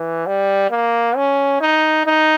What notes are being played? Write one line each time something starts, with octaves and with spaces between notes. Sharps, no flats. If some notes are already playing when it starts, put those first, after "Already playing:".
Already playing: E3
G3
A#3
C#4
D#4
D#4